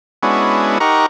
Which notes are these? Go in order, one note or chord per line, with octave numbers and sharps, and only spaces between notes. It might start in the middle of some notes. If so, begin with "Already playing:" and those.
G#3 B3 C#4 D4 E4 F#4
D#4 G4 A#4 F#5 A#5 C#6